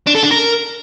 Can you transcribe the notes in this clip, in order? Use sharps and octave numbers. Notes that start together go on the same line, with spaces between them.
D4
A4
D4
A#4